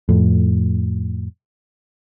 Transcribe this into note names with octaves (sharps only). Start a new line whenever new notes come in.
F2 A2